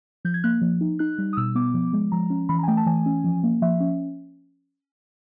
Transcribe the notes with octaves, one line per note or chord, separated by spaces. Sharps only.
F3 G6
G#6
A#3 F#6
F3
D#4
D#4 F#6
G3
D#6
B2 E6
B3 D6
F3
G#3
F3 A#5
C#4
E3 B5
A#5
G#5
A3 G5
A5
E3 G#5
C#4
F3
A#3
F3 E5
C#4